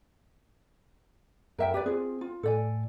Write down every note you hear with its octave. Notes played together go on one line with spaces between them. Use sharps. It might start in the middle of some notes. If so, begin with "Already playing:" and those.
F#2 A#4 E5 G5
G4 B4 D5
C4 F4 G#4
F4
A2 A4 D5 G#5